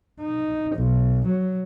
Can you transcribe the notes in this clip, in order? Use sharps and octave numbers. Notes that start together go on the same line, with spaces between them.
D#4
B1
F#3